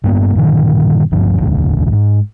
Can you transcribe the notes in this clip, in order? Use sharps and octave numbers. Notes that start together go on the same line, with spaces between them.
G2 A#3 B3
G2 A#2 D3 D#3
G#1 D2 G2 F3
E1 A1 D2
G#2